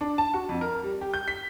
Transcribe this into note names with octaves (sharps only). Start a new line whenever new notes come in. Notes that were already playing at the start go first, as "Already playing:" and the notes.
D4
A5
F#4
F2
A#4
G3
G4
G6
B6